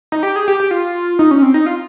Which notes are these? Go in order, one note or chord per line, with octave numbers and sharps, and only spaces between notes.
D#4
G4
G#4
G4
G4
F4
D#4
C#4
C4
D#4
F4